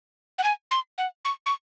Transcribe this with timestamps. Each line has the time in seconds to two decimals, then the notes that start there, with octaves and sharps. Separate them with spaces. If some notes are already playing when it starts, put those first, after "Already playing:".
0.38 F#5
0.44 G#5
0.71 C6
0.98 F#5
1.25 C#6
1.46 C#6